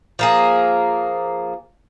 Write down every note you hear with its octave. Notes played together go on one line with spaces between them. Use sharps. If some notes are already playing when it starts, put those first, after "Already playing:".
F3 A#3 G#4